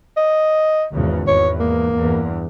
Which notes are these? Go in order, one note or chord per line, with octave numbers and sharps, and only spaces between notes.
D#5
G#1 E2 C#3
E2 G#2 C#5
A#3
E2 G2